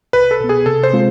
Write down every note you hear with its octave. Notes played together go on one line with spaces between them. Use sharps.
C2 B4
A4
B2 B3
G#4
C3 A4
C5
G#3 C4 F4